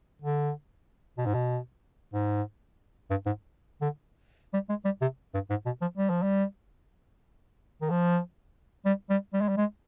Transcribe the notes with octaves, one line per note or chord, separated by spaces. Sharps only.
D3
B2
G#2
B2
G#2
G2
G#2
D3
G3
G#3
G3
C3
G2
G#2
B2
F3
G3
F3
G3
D#3
F3
G3
G3
G3
G#3
G3
G#3